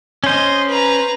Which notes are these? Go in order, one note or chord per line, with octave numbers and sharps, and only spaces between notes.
C#4 C5 D#5 C6
B4 A#5